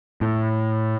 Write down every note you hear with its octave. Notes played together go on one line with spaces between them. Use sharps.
A2